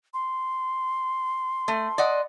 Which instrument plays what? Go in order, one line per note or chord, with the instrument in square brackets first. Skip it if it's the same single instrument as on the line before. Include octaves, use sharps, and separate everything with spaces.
[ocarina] C6
[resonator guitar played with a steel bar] A3
D5 D#5 F#5